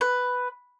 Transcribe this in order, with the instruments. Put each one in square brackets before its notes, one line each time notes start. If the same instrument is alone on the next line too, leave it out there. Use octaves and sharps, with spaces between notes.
[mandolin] B4